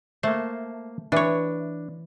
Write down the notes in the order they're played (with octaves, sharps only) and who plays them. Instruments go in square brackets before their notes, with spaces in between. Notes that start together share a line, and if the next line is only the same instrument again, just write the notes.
[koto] A3 [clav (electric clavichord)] A#3 C5
[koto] E3 C#5 [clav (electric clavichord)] D4